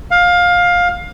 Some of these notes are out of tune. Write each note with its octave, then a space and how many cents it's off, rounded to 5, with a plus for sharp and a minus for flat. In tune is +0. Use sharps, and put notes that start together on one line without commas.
F5 +20